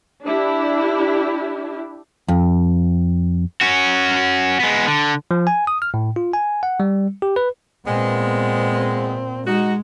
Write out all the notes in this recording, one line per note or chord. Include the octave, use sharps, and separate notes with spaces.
D4 E4 G4
F2
C#4 F#4
G#3 B3
D3
F3
G#5
D#6
F6
A2
F4
G#5
F#5
G3
G4
B4
A#2 G#3 B3 C4
G#3 D#4 F#4